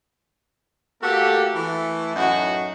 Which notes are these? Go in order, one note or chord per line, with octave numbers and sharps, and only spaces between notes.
A3 A#3 F#4 G4 A4
E3 A3
F#2 A2 D#4 F#4